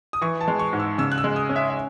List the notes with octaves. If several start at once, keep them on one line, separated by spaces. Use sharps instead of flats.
D#6
E3 C#6
A5
G#3
C#6
G#2
E6
C#3 E6
F#6
E6
G#3
D#6
C#4
E5
E5